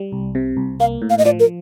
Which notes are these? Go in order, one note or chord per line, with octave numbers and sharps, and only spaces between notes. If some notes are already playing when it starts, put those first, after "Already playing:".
Already playing: G3
C2
C3
C2
A#3 F5
A2
F5
D#5
F3 D5
A#4